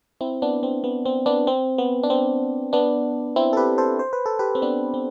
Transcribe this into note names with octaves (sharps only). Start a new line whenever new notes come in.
C4 E4
B3 D4
C4
B3
C4
B3 D4
C4
B3
D4
C4
B3 D4
C4 E4
A4
G4 B4
A4 C5
C5
B4
A4
G4 B4
C4
B3 D4
C4